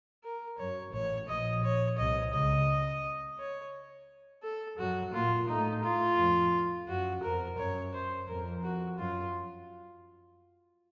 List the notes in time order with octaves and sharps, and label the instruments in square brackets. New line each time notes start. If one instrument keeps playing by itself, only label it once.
[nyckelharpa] A#4
[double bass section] F#2 [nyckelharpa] C#5
[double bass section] A1 A2 [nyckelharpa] C#5
[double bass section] A#1 A#2 [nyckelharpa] D#5
[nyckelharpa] C#5
[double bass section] C2 C3 [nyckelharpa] D#5
[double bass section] C#2 C#3 [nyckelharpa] D#5
[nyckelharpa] C#5
A4
[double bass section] F#2 F#3 [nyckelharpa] F#4
[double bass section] A#2 A#3 [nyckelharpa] F4
[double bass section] A2 A3 [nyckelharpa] D#4
[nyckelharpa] F4
[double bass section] F2 F3
[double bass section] F#2 [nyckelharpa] F#4
[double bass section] F2 [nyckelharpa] A#4
[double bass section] F#2 [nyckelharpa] C#5
[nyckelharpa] C5
[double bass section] F2 [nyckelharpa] A#4
[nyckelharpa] F#4
[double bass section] F#2 [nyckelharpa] F4